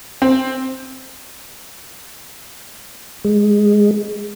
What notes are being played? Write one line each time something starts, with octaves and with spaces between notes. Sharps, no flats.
C4
G#3